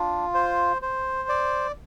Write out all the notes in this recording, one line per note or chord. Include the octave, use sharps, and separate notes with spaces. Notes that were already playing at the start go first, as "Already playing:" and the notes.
Already playing: D4 F4
C5
C5
D5